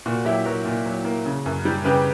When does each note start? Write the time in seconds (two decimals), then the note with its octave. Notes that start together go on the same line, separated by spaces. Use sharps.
0.06 A#2 F#4
0.25 F#3 E4 G4
0.45 F#3 F#4 A#4
0.65 A#2
0.86 F#3
1.05 A#3
1.26 C#3
1.46 F#2
1.65 G3
1.84 C#3 G4 B4